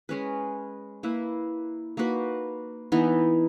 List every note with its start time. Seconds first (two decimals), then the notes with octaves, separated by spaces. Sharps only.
0.09 G#3 C#4 G#4 B4
1.03 A#3 E4 B4
1.97 A#3 D#4 F#4 B4
2.92 E3 B3 D#4